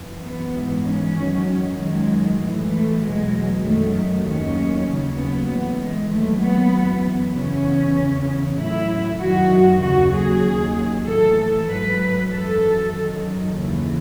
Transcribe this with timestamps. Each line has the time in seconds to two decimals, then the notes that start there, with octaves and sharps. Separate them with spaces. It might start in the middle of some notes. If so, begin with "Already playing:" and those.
Already playing: F#2 E3
0.22 B3
0.53 G#2 E3
0.84 C#4
1.15 F#2 D#3 F#3
1.77 F#2 D#3 F#3 G#3
2.39 A2 E3
2.70 A3
3.01 E2 B2 F#3 G#3
3.63 F#2 D#3 F#3 A3
4.24 D#2 D#3 F#3 C#4
4.87 D#2 C#3 F#3
5.18 B3
5.49 A2 E3
5.79 G#3
6.11 D#2 D#3 F#3 A3
6.42 B3
6.72 F#2 E3
7.35 E2 C#3 E3 C#4
7.97 E2 C#3 E3
8.58 A2 F#3 E4
9.21 F#2 D#3 F#3 F#4
9.82 D#2 C#3 F#3 F#4
10.14 G#4
10.44 D#2 D#3 F#3
11.06 A2 E3 A4
11.68 G#2 F#3 B4
12.30 F#2 E3 A4
12.92 F#2 D#3 F#3
13.54 D#2 C#3 E3